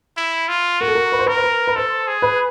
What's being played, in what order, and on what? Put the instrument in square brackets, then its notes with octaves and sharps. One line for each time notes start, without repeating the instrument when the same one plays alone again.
[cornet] E4
F4
[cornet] F#4 [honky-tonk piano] A#4
[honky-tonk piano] A4
A#4
B4
C5
[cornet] A#4 [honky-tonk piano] B4
[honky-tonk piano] C5
B4
B4
[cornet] A4 [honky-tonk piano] C5
[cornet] G#4
[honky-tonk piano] B4